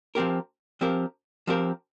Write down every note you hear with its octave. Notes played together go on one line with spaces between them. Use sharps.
F3 C4 G4 A#4
F3 C4 G4 A#4
F3 C4 G4 A#4